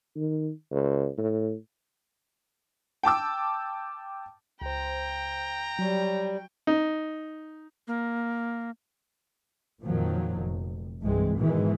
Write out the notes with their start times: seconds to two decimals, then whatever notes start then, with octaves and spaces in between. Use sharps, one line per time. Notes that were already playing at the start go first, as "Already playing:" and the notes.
0.16 D#3
0.71 C#2
1.18 A2
3.03 G5 A5 D6 E6
4.62 C#2 C5 G5 A#5
5.79 F#3 G3 C#5
6.67 D#4
7.88 A#3
9.82 F2 A#2 D#3 F3 F#3
10.36 F1
11.02 C2 G2 E3 G#3 C4
11.36 G#2 B2 D#3 E3 G#3